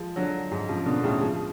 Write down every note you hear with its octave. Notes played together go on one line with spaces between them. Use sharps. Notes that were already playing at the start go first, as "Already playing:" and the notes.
Already playing: F3 G#3
D3 F#3
G#2
C#3 F3
B2 D3
A2 C#3
F3 G#3